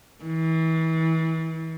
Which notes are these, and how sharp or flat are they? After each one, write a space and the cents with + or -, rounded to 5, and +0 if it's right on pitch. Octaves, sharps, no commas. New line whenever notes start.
E3 -35